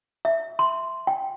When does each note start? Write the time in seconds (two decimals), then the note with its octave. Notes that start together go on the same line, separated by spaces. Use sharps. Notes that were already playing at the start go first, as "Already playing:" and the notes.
0.25 E5
0.59 C6
1.07 G5